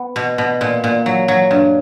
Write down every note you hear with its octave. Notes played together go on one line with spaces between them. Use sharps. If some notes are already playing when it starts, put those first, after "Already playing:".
Already playing: B3
B2
B2
A#2
A#2
F#3
F#3
G2